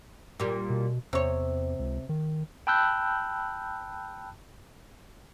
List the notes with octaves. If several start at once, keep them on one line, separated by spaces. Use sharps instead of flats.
A#2 G3
B2
E2 C3 C#5
C#2
D#3
G5 A5 B5 E6 F#6 G6